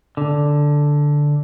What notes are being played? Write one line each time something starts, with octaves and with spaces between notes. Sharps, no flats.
D3